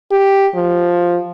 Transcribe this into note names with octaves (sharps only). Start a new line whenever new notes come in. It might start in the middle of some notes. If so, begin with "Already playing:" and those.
G4
F3